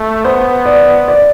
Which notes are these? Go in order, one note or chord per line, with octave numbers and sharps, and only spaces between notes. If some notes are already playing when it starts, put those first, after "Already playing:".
Already playing: A3
B3 C5
D5
D5